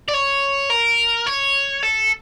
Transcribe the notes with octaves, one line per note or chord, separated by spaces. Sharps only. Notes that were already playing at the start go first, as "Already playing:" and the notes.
D5
C#5
A#4
C#5
A4